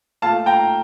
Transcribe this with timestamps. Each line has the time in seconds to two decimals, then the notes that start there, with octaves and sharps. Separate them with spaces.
0.22 A#2 A3 F5 A5
0.46 G5 A#5